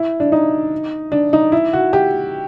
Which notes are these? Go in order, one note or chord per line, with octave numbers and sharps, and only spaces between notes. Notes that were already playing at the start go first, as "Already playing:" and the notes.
Already playing: E4
D4
D#4
D4
D#4
E4
F#4
G4